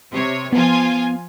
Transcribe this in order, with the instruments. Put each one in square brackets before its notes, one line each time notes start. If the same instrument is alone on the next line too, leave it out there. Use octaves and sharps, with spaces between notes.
[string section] C3 C#5
[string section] F3 F4 G#5 [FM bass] B3